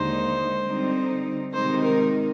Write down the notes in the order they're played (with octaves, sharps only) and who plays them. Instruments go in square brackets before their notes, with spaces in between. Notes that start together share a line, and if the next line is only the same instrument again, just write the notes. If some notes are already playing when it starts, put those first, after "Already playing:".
Already playing: [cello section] D#2 D3 G#3 D#4 [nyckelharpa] C5
[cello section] D3 G3 C4 D#4
[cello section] C3 D#3 G#3 D#4 [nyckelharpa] C5
[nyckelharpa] A#4